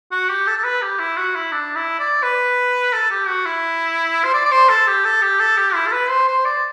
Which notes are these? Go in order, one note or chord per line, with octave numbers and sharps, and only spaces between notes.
F#4
G4
A4
A4
B4
G4
E4
F#4
E4
D4
E4
D5
B4
A4
G4
F#4
E4
C5
D5
D5
C5
A4
G4
A4
G4
A4
G4
E4
A4
B4
C5
C5
D5